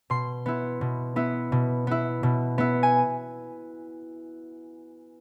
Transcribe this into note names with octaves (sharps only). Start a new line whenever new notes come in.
B2 C6
B3 E4
B2
B3 E4
B2
B3 E4
B2
B3 E4
G#5